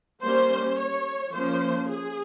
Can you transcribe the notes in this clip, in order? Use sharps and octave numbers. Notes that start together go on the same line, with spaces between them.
G3 A#3 C#4 C5
C#5
F3 A#3 C#4 C5
G#4